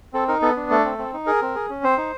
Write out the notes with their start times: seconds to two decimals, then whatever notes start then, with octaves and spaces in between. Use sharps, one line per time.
0.13 C4 A4
0.28 D#4 A#4
0.42 B3 A4
0.56 D4
0.70 A3 A4
0.85 C4
0.98 C4
1.13 D#4
1.27 G#4 A#4
1.42 C4
1.55 G#4
1.69 C#4
1.83 C4 C5
1.98 D#4